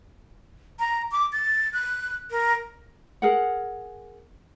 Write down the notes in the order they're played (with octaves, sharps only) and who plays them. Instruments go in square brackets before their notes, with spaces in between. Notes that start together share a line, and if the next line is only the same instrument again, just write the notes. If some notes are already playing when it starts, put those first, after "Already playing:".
[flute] A#5
D6
A6
F#6
A#4
[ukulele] G#4 A#4 F#5